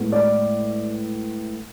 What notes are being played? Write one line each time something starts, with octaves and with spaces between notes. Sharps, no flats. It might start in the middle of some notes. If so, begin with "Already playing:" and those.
Already playing: A2 G#3 B3
D5